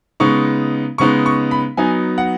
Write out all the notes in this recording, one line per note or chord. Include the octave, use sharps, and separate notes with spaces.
C#3 G#3 B3 D#4 C#6
C#3 G#3 B3 D#4 C#6
C#6
B5
F#3 B3 D#4 G#5
F#5